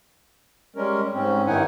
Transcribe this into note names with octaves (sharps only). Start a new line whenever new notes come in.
G3 G#3 C#4 A#4
G#2 C4 C#4
G2 D#3 D#4 E4 F#5 G#5